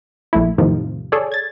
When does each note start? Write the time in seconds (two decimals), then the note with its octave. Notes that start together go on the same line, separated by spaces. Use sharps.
0.33 A#1 A3 E4
0.58 E2 A2 C3 D#3 F3
1.12 G#4 A4 C#5 D5
1.32 G#6 A6